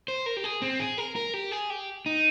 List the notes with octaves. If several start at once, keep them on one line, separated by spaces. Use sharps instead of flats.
C5
A#4
G4
G#4
C4
G#4
A#4
A#4
G4
G#4
G4
D#4